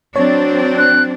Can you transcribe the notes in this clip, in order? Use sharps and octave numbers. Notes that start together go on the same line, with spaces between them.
F#3 C4 D4 C#5
F#6